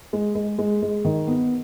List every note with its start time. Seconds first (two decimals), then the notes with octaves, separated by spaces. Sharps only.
0.13 G#3
0.35 G#3
0.58 G#3
0.82 G#3
1.05 D#3
1.27 B3